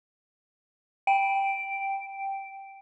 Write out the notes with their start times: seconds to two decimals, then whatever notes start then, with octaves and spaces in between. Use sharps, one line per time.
1.07 G5 D7